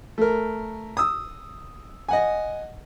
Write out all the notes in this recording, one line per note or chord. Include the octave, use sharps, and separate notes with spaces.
A3 A#4
D#6 E6
D#5 F#5 G#5